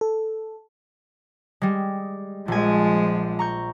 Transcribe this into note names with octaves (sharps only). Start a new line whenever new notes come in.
A4
G3 G#3
A#1 F3 G#3 G#5
A#5 C#6 G6